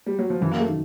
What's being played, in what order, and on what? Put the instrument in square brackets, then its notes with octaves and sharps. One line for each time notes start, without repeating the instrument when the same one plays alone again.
[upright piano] G3
F#3
F3
[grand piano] F#2 [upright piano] E3
[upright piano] A#3
A3
[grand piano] D#3